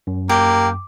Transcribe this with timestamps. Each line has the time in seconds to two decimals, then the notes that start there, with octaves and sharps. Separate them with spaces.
0.07 F#2
0.29 A#3 G4